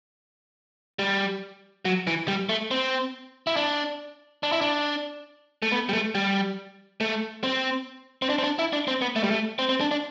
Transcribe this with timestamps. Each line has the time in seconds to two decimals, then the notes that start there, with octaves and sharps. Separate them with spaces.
0.99 G3
1.85 F#3
2.07 E3
2.28 G3
2.49 A3
2.71 C4
3.47 E4
3.56 D4
4.43 D4
4.52 E4
4.61 D4
5.62 A3
5.72 B3
5.89 G3
5.93 A3
6.15 G3
7.01 A3
7.44 C4
8.22 C4
8.29 D4
8.39 C4
8.44 D4
8.59 E4
8.73 D4
8.88 C4
9.02 B3
9.16 A3
9.24 G3
9.31 A3
9.59 C4
9.69 C4
9.80 D4
9.91 D4